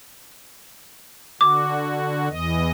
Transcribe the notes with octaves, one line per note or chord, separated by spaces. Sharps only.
D3 F#4 D6
E2 E3 D#5